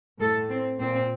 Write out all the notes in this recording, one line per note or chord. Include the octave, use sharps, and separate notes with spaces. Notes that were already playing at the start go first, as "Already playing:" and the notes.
A2 A4
C4
A#2 C4